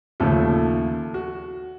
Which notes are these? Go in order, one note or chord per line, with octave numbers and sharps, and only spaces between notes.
D#2 C#3 F3 A3 A4
F#4